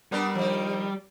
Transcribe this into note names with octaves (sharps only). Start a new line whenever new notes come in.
G3 B3 D4 A#4
D#3 F3